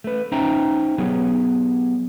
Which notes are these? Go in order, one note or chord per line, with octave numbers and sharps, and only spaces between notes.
A3 B4
C#4 D#4 C5 E5 G5 A#5
F#3 B3 G4 G#4 C#5